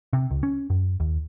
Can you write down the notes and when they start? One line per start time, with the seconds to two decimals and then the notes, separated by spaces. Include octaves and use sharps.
0.13 C3
0.30 C#2
0.43 C#4
0.70 F#2
1.00 D#2